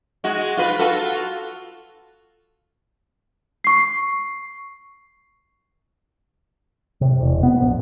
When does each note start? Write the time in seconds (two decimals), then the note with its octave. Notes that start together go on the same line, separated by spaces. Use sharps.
0.24 G#3 F#4
0.57 F4 B4
0.79 F4 F#4 A4
3.64 C#6 C7
7.01 C3
7.21 E1
7.43 B3
7.61 A#1